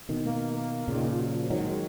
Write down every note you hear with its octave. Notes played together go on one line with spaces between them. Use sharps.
B2 D#3
A#3
A#3
A#2 C#3
D#3
F3
F#3
F3
D#3 F#3 G#3